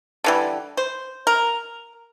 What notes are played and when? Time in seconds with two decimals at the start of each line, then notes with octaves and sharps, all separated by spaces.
0.24 D3 E3 G3
0.77 C5
1.27 A#4